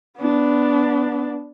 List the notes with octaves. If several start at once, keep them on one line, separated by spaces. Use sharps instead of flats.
B3 D4